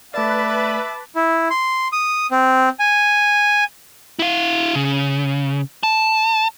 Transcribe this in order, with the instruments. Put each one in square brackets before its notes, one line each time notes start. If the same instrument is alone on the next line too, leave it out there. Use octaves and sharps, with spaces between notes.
[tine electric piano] A3 D5 [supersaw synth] B4 B5 [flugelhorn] E5 [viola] A5 D6
[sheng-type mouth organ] E4
C6
D#6
C4
G#5
[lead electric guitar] E4 F5
C#3
A5